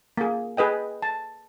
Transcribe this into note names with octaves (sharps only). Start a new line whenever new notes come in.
A#3 G#4
G#4 B4 D#5 G5
A5